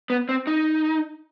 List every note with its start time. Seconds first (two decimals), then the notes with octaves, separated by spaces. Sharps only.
0.10 B3
0.29 C4
0.47 D#4